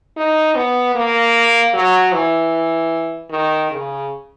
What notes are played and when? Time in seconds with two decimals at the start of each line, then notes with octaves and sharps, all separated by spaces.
0.17 D#4
0.55 B3
0.95 A#3
1.74 F#3
2.13 E3
3.30 D#3
3.71 C#3